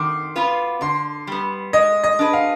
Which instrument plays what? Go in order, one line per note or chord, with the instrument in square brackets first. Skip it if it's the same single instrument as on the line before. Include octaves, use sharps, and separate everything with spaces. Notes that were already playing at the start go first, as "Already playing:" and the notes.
Already playing: [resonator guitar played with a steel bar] D#3 [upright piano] C6 D6
[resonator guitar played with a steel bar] B3 F4 B4
[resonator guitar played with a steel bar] D3 [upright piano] C6
[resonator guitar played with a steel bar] G3 B3
[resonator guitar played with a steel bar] G#3 [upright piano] D#5
[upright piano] D#5
[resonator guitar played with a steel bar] D4 G#4 B4
[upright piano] F5